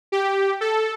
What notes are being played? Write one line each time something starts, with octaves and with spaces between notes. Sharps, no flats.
G4
A4